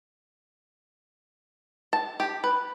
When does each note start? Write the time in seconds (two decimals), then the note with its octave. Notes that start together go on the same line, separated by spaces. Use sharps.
1.93 A5
2.20 G4
2.44 B4